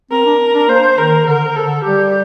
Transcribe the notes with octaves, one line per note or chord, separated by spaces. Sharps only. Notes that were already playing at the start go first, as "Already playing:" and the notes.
C4 A#4
D4
D4
A#3 C5
D#3 A#4
D3 A#4
A4
D3
G3 G4